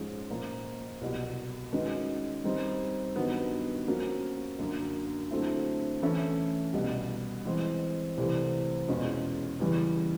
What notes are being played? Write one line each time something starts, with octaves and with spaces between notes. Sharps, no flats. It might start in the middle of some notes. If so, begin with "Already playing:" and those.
Already playing: G#2 F3 G#3 C#4
A#2 F3 A#3
C2 B2 F#3
D#3 G#3 C#4 F#4 B4
D#3 G3 C4 D#4
G2 D#3 F#3 B3
F3 A#3 C#4 F#4 A#4
F#2 D3 F#3 A#3
D3 F#3 A3 C4 E4
E3 A3 C#4 E4 A4
C2 B2 G3
E3 G#3 C4
C2 C3 E3 A3 C4
E2 B2 G#3 C#4 F4
E2 C#3 E3 G3